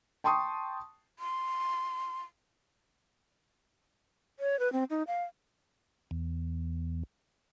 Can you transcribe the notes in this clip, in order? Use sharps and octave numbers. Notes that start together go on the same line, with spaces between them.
G5 A5 C6 C#6 D#6
C6
C#5
B4
C4
D#4
F5
E2